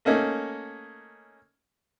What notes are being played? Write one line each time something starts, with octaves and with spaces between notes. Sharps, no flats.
A3 A#3 C#4 D#4